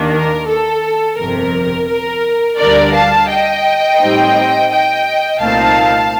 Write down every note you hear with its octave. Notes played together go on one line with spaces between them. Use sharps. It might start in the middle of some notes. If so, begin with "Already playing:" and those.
Already playing: D#2 D#3 A#3 D4
A#4
A4
G1 F2 C3 A#4
A#4
D2 D3 G3 D4 A#4 D5
F5 A5
D#5 G5
A2 G3 C4 D#4
D#5 G5
C2 A#2 A3 C4 D#4 F5 A5